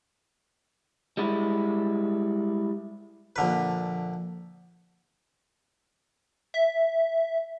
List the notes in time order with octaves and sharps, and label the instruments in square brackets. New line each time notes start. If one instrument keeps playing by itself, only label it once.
[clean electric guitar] G3 G#3 E4
[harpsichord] A#1 D3 B4
[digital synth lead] E5